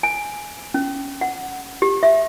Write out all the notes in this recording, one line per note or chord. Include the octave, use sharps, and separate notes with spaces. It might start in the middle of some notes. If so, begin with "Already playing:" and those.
G#5
C#4
F#5
G4
E5